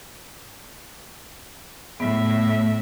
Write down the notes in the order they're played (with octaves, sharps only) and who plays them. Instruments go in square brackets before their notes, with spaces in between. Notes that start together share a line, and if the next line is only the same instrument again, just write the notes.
[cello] A2 E5 [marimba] B3